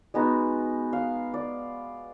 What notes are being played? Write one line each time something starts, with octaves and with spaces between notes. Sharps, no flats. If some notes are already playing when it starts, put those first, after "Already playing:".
G#3 B3 D#4 F#4
F5
D5